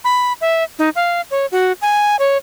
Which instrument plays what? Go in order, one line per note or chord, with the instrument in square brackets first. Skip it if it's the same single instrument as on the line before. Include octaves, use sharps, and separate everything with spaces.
[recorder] B5
E5
D#4
F5
C#5
F#4
G#5
C#5